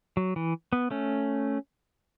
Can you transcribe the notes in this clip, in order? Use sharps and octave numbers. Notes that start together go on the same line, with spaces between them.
F#3
E3
B3
A3 C#4